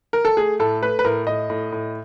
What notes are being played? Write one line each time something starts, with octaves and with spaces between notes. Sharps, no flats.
A#4
A4
A3 G#4
A2 A4
A3 B4
B4
A2 A#4
A2 D#5
A2
A2